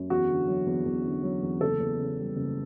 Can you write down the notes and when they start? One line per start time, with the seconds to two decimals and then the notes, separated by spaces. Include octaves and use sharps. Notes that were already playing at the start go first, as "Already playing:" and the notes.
Already playing: F#2
0.10 E2 F#4
0.29 D3
0.48 F#3
0.66 E2
0.86 E2
1.05 D3
1.23 F#3
1.43 E2
1.61 F#1 A4
1.80 E2
1.99 C#3
2.18 G3
2.36 F#1